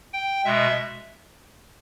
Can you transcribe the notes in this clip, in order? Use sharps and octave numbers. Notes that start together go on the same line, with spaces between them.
G5
B2 G#3 E5